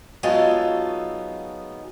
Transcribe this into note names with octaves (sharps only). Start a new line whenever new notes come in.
F#3 G#3 B3 D#4 F4 A4